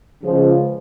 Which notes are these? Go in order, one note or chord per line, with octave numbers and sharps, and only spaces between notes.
C#2 C#3 F3